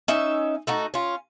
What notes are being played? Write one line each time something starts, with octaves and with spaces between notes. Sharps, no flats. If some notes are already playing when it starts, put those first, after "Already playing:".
C#4 D#4 E5
A3 D#4 F#4
C#4 F4